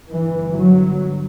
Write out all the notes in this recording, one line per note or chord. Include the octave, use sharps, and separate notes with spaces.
G1 G2 E3
F#3